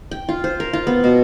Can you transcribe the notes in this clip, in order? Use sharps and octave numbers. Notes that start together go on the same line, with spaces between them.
G5
F4
C5
A#4
F4
B3
B2